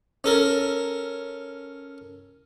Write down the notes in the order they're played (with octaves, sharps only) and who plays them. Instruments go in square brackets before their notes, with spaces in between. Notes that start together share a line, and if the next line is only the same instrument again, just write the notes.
[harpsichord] C#4 A4 A#4